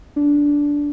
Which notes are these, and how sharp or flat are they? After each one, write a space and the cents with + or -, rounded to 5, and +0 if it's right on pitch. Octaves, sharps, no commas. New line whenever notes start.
D4 -15